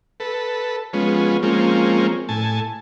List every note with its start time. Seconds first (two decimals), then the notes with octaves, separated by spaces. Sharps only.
0.20 A4 B4
0.93 F3 G#3 B3 C#4
1.43 F3 G#3 A#3 C4 C#4
2.29 A2 G#5 A5